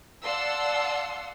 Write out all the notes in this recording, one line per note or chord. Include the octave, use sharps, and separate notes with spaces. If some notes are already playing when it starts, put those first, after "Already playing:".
D5 F5 F#5 A5 C6 E6